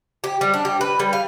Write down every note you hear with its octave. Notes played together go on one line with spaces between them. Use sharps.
G4
G3
D4
G4
B4
G3
F5